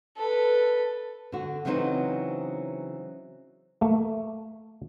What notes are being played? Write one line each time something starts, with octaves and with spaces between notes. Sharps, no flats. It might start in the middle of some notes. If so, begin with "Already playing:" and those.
A4 B4
D3 F#4
C#3 E3 F#3 C4 D#4 B4
A3 A#3